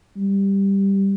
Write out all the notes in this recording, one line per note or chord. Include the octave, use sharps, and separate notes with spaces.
G3